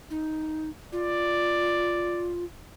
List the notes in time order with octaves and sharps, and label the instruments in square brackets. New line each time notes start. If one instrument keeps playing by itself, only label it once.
[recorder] D#4
[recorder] F4 [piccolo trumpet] D5